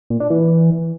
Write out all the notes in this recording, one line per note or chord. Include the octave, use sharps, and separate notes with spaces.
A#2
D4
E3